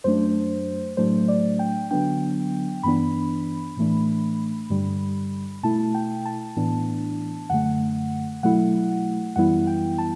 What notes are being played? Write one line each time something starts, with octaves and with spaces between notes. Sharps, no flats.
F#2 F#3 A3 D4 C5
A2 F#3 A3 D4 C5
D5
G5
D3 F#3 B3 D4 G5
G2 E3 B3 D4 B5
A2 E3 A3 D4
G2 D3 G3
B2 A3 E4 A5
G5
A5
A2 E3 B3 D4
F#2 D3 A3 F#5
B2 F#3 A3 E4 F#5
F#2 E3 G3 B3 E4 F#5
G5
A5